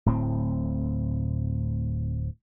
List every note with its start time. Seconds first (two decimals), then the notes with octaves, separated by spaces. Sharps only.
0.06 D1 A2 C4